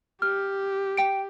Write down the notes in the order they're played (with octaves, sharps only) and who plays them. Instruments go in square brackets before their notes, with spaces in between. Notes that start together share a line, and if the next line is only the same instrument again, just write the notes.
[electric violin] G4 [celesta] F6
[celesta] G5 D7